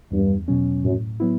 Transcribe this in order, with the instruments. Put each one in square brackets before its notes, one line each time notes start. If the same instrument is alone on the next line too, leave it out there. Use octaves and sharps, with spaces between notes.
[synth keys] E2 [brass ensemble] G2
[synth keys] B2 F#3 C#4
[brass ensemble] F#2 [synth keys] A2
[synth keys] F#3 B3 E4